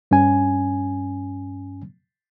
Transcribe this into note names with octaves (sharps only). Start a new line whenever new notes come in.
G2 C#4 G#5